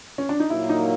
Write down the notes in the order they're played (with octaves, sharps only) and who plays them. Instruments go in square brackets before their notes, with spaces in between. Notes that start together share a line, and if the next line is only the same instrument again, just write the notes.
[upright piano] C#4
D4
D#4
[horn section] A#2 F#3 A#3 [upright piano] E4
[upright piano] D#4